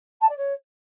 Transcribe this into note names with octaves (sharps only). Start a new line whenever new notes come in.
A5
D5
C#5